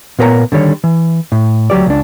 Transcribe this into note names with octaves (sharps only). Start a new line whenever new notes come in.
A#2 B3 A#4 B4 C#5 A#5
D3 D#3 G3 C#5
E3
A2
D2 F#3 G4 D5
C#2 D4